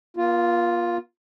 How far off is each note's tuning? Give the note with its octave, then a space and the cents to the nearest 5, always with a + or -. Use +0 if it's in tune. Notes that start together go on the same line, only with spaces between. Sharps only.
A#3 +45 F4 +0